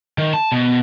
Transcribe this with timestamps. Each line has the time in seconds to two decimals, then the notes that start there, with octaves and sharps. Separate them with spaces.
0.18 D#3
0.34 A5
0.52 B2